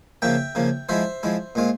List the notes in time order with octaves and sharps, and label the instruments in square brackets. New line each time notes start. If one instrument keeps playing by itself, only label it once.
[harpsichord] C#3 F3 A#3 E5 G5
C#3 F3 A#3
F3 G#3 E4 C5 E5
F3 G#3 E4
A#2 G#3 C4 F4